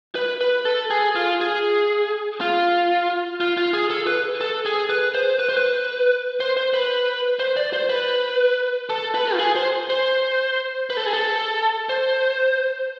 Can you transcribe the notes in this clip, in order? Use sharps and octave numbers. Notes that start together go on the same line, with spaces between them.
B4
B4
A4
G#4
F4
G#4
F4
F4
F4
G#4
A4
B4
A4
G#4
B4
C5
B4
C5
B4
C5
C5
B4
C5
D5
C5
B4
A4
B4
F4
G#4
C5
C5
B4
A4
G#4
A4
C5